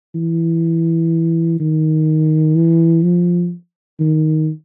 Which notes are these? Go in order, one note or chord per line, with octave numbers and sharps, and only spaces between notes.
E3
D#3
E3
F3
D#3